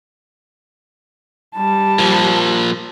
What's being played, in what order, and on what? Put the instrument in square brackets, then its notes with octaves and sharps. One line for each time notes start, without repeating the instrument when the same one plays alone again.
[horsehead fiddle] G3 A5
[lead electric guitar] A#2 F3